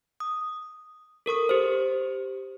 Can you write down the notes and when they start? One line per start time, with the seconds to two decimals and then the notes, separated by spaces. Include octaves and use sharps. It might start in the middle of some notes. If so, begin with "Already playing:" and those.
0.20 D#6
1.26 A4 A#4 C#6 D#6
1.49 G4 C5